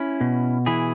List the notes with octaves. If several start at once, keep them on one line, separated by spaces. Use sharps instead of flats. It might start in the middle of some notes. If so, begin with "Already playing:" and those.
Already playing: C#4 E4
B2
E3 E4 G#4